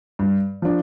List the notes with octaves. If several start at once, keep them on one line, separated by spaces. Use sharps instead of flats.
G2
F3 D4